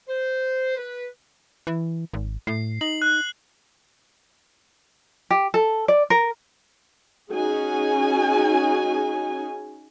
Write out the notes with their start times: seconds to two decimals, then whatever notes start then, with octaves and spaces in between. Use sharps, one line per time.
0.08 C5
0.77 B4
1.67 E3
2.13 G#1
2.47 A2 C7
2.81 D#4 F#7
3.02 F#6
5.30 G4
5.54 A4
5.88 D5
6.10 A#4
7.31 C#4 D#4 F#4 G#4 G#5